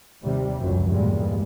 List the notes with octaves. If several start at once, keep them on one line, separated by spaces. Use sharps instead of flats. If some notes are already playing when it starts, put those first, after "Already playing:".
D#2 C3 G3
F1 C#2 F#2
B1 E2 G2 A#2 G3 G#3